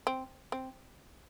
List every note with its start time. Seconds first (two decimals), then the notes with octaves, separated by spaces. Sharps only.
0.07 C4
0.52 C4